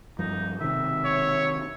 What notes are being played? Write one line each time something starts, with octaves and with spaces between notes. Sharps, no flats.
G2 F3 D#4
E1 C3 D#3 E5
C#5